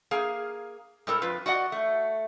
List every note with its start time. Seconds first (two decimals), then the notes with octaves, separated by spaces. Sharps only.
0.11 A#3 G#4 F5
1.07 G#2 G3 A4 A#4
1.22 F2 F4 B4
1.46 F#4 D5 D#5 F#5
1.72 A3